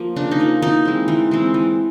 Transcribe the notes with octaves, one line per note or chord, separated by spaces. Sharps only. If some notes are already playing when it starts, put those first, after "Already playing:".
Already playing: F3 A#3
C#3 D4
D#4
F3 A#3
E3 D#4
G#3 C4
E3
G#3 C4
E3